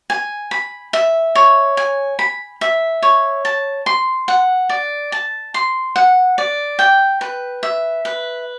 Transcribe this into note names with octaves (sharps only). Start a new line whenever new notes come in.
G#5
B5
E5
C#5
G#5
B5
E5
C#5
A5
C6
F#5
D5
A5
C6
F#5
D5
G5
B4
E5
B4